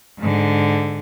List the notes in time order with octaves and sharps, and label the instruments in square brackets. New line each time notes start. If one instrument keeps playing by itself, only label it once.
[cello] G#2 D3